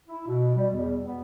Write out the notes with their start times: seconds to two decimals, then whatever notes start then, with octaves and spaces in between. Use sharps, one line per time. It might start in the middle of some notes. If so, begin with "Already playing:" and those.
0.08 E4
0.27 B2
0.56 G3
0.73 E2
1.03 B3